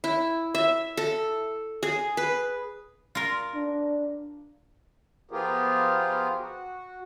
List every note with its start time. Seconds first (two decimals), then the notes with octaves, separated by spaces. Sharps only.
0.04 E4
0.54 E5
0.97 A4
1.83 G#4
2.17 B4
3.15 F4 A#4
3.55 D4
5.31 F3 B3 F4 G4 G#4 A#4
6.38 F#4